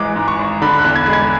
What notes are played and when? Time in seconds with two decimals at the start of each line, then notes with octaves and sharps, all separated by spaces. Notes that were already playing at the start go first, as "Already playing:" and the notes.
Already playing: G#1 G#2 E3 G#3 D6
0.16 G#2
0.28 C#6
0.39 G#1
0.62 D3 B5
0.79 F#6
0.84 E2
0.96 G#6
1.07 G#3
1.13 G#6